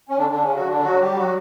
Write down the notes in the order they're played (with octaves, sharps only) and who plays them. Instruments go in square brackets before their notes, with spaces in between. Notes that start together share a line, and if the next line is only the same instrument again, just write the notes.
[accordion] C#4
D3 D4
D3 D4
C#3 C#4
F#3 F#4
D3 D4
F#3 F#4
G3 G4
F#3 F#4